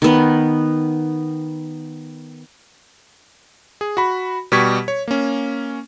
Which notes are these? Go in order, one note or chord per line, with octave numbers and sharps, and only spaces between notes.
D#3 B3
G#4
F#4 B5
B2 G3 G4 C#6 G#6 B6
C#5
A#3 C#4